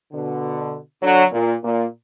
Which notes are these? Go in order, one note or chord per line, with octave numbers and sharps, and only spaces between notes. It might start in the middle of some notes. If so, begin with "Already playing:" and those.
B2 D3
D3 F#3
A#2
A#2